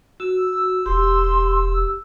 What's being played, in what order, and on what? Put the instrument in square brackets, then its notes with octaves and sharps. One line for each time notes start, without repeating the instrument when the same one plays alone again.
[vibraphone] F#4 [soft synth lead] E6
[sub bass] E1 [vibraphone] G4 [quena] C6